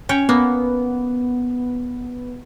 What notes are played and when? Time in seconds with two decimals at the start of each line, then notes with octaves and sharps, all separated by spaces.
0.09 C#4 C#5 G5
0.29 A#3 B3